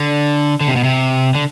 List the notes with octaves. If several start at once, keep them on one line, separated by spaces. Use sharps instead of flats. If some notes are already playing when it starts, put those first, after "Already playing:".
Already playing: D3
D3
C3
B2
C3
D3